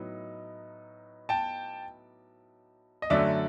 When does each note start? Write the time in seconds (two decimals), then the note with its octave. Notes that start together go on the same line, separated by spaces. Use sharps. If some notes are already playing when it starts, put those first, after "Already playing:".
Already playing: A2 F#3 B3 D#4
1.29 G5 A5
3.02 D#5
3.10 F#2 D3 F#3 A3 D5 E5